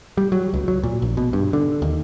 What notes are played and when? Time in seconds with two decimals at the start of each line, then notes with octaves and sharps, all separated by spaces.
0.17 G3
0.32 F#3
0.54 C#2
0.68 F#3
0.84 A#2
1.02 A#1
1.17 B2
1.33 G2
1.53 D3
1.82 D#2